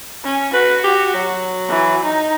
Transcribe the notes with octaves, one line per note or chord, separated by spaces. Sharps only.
C#4
F#4 B4
G4
F#3
E3
D#4